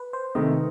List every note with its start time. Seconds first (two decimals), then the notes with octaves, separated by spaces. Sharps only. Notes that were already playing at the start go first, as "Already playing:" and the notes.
Already playing: B4
0.13 C5
0.35 C3 D#3 A3 D#5